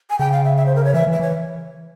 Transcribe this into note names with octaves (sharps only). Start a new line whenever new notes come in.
G#5
C#3 G5
F5
E5
E5
C5
A#4
C#5
E3 E5
E3
E5
E3 C#5